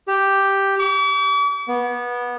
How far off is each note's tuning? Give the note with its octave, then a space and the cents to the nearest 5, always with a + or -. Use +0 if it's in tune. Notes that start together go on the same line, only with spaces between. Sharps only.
G4 +0
D6 -45
B3 -20